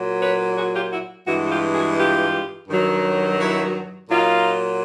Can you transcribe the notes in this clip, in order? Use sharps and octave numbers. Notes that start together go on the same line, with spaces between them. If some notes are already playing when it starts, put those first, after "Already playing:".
Already playing: A#2 F#3
B4 C#5
F#4 G#4
F4 G4
E4 F#4
G2 E3 G#3 E4 F#4
F#4
F4 G4
F#4 G#4
F4 G4
G2 D#3 F#3
E4 F#4
A#2 F#3 D#4 F4